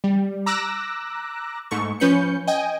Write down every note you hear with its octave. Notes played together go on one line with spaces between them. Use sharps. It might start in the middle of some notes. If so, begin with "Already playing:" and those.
G3
A#5 D6 E6 F#6 A#6
G#2 A3 C#6
F3 C#4 B4 G6 C#7
D#5 G5 G#5